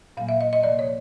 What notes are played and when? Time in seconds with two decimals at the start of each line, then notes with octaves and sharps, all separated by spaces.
0.17 A#2 F#3 A#3 F5
0.29 E5
0.41 D#5
0.53 D#5
0.63 C3 F3 A#3 D5
0.79 C#5